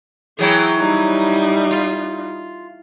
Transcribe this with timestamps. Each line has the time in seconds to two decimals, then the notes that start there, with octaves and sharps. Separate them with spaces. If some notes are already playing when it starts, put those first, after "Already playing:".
0.39 E3 F#3 E4 G#4 G5
0.78 G3 D#4
1.71 F4